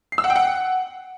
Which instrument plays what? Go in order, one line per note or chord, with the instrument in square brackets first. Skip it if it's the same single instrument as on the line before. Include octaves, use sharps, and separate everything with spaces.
[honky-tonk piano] C7
E6
F#5
G5
F#5